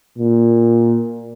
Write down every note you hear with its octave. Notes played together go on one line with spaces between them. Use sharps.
A#2